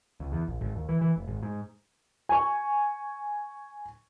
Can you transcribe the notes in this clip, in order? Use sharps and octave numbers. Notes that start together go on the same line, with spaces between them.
C#2
E2
A#1
G#1
D#2
E3
E3
F1
G#1
G#2
G#5 C#6